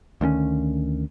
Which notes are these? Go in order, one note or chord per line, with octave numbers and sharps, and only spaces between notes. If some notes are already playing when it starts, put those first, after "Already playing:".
D2 D#3 C4 C#4